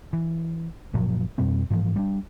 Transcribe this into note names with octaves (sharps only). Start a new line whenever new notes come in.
E3
F#1 A#2 F3 F#3
F2 B2 G3 C4
G#2 E3 F3
G3 D4